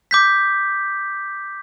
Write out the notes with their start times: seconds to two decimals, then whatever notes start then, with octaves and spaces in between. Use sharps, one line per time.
0.11 D6 G6 B6